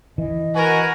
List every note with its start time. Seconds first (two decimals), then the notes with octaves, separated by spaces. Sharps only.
0.18 E3 D#5
0.55 F#4 A#4 B4 G#5